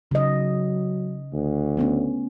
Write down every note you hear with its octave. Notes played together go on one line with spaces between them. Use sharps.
C#3 F#3 D#5
D2
A3 B3 C#4